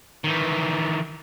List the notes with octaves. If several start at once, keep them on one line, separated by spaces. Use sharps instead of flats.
D#3 E3